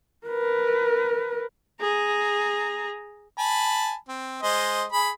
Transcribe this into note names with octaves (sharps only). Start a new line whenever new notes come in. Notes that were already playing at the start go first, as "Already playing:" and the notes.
A#4 B4
G#4 A#5
G#5 A5 B5
C4
G#3 C5 D#5
G#4 B5